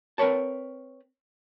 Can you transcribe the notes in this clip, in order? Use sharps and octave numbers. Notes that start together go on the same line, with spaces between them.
C4 A#4 B4 C#5 A5